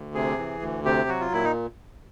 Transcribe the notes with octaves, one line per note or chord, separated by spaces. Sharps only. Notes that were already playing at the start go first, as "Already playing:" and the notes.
Already playing: D2
C3 G#4
E3
D2
C3 G4
F#3 F#4
F4
A#2 E4
D#4